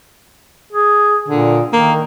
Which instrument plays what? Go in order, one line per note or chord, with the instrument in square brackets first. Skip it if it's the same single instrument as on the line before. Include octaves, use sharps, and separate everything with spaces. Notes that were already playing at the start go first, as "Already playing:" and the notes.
[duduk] G#4
[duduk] A#2 [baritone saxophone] D3
[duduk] D#3 [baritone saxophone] A#3